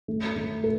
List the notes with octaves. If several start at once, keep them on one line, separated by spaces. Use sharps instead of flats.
A3
A3
A4